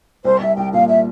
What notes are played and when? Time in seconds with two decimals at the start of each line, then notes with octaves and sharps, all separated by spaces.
0.25 C2 C5
0.40 C2 E5
0.57 C2 G5
0.72 A#2 F5
0.88 E5